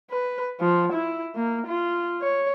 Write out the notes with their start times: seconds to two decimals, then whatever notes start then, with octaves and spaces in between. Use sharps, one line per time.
0.11 B4
0.60 F3
0.93 E4
1.35 A#3
1.67 F4
2.22 C#5